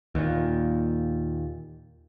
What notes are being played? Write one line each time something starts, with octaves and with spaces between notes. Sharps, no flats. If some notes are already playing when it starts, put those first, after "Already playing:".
D#2 A#2